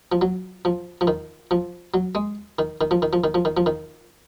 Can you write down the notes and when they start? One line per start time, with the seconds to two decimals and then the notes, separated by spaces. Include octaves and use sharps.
0.12 F3
0.21 F#3
0.65 F3
1.01 F3
1.07 D#3
1.51 F3
1.94 F#3
2.15 G#3
2.59 D#3
2.81 D#3
2.91 F3
3.02 D#3
3.13 F3
3.24 D#3
3.34 F3
3.45 D#3
3.57 F3
3.66 D#3